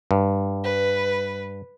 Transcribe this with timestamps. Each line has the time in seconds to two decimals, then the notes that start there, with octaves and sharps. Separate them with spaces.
0.11 G2
0.64 B4